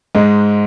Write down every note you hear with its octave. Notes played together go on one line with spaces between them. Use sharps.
G#2 G#3